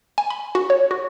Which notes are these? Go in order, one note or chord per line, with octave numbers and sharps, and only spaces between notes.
G#5
B5
F#4
C#5
F#4